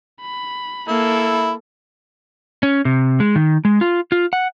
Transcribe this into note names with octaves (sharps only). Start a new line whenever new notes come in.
B5
A#3 E4 A4
C#4
C3
G#3
D#3
G#3
F4
F4
F#5